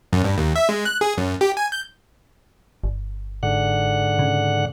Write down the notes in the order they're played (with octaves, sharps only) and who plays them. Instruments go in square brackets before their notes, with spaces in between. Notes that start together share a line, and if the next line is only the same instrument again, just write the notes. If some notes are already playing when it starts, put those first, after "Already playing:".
[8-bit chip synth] F#2
G2
D#2
E5
G#3
F#6
G#4
F#2
G4
G#5
G6
[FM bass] G1
[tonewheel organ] G#2 D3 F#5
[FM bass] C#3